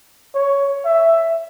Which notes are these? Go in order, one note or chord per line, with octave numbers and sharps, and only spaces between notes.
C#5
E5